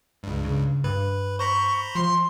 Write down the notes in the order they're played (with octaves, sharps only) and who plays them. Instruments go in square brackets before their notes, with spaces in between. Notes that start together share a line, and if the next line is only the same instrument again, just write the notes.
[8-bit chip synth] C#2 G2
[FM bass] C#3
[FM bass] G2 [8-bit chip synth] B4
[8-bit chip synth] C5 A#5 B5 [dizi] C#6
[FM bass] F3 [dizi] C6